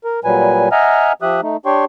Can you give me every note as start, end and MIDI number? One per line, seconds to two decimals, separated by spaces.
0.04 0.20 70
0.24 0.69 46
0.24 0.69 54
0.24 0.69 55
0.24 0.69 71
0.24 0.69 80
0.72 1.13 75
0.72 1.13 76
0.72 1.13 78
0.72 1.13 80
0.72 1.13 82
0.72 1.13 89
1.22 1.41 53
1.22 1.41 67
1.22 1.41 76
1.22 1.41 87
1.22 1.41 90
1.42 1.57 57
1.42 1.57 63
1.66 1.85 62
1.66 1.85 67
1.66 1.85 73
1.66 1.85 79
1.66 1.85 84
1.66 1.85 85